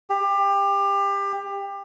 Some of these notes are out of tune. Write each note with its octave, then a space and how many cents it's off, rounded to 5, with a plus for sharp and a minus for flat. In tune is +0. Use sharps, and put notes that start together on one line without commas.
G4 +25